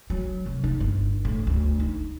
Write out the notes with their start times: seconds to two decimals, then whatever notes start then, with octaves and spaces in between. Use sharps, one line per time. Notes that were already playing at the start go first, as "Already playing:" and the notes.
0.10 F#3
0.46 C2
0.64 D#4
0.80 G1
1.25 A2
1.47 D2
1.80 D#4